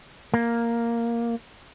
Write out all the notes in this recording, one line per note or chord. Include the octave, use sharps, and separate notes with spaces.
A#3